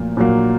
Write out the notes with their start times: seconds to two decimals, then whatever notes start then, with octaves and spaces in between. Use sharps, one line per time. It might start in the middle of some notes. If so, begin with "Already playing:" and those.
Already playing: A#2 F3 F#3 A3 A#3
0.17 A#2 F#3 A#3